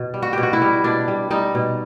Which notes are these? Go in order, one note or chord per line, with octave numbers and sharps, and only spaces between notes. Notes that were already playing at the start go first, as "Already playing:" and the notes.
Already playing: B2
G3
F#4
B2 G4
F#4
E4
G3
B2 D4
G3
G3 D#4
B2